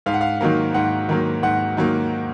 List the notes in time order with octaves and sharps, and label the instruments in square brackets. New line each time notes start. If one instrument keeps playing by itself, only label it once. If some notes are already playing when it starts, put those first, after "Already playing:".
[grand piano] G#2 F5
F#5
F5
D#3 F#3 A#3
G#2 F#5
D#3 F#3 A#3
G#2 F#5
D#3 F#3 A#3